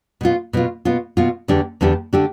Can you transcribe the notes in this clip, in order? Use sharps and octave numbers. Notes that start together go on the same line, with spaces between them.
B2 B3 F4
B2 B3 F4
B2 B3 F4
B2 B3 F4
E2 D3 A3 D4 G4
E2 D3 A3 D4 G4
D3 A3 D4 G4